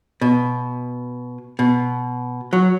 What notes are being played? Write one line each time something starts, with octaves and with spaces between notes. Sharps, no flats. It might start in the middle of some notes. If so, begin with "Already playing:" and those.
B2
B2
F#3